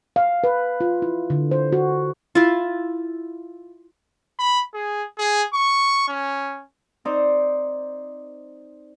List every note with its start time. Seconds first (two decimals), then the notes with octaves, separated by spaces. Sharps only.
0.16 F5
0.44 B4
0.81 F4
1.02 E4
1.30 D3
1.51 C5
1.72 F#4
2.35 E4 F4
4.39 B5
4.74 G#4
5.18 G#4
5.54 C#6
6.08 C#4
7.05 C4 D#4 C5 D5